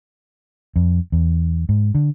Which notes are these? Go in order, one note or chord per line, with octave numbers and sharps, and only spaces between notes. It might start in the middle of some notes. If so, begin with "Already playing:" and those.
F2
E2
G#2
D3